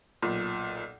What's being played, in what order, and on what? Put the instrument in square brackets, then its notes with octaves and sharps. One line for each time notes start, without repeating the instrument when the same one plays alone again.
[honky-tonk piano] B1 A#2